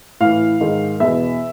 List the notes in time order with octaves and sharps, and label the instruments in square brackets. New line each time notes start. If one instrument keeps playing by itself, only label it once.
[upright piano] A2 E3 F5
G#2 D#3
E2 B2 E5